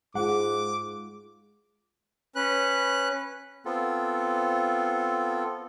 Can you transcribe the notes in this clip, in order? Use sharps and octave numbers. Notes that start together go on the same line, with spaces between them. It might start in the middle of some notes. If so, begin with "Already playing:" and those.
G#2 G#3 F4 F#5 D6
C#4 B4 F#6
B3 C4 F4 A4